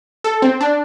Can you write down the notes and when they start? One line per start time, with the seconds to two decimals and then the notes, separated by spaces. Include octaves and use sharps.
0.24 A4
0.42 C4
0.61 D4